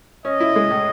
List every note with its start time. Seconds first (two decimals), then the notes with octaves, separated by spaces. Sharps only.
0.25 C#4 D#5
0.40 E4
0.56 G#3
0.71 A2